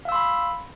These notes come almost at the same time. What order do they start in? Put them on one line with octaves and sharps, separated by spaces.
F5 E6 C6 B5